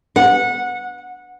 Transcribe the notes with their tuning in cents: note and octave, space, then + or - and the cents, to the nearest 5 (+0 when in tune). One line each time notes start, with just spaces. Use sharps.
F#5 -20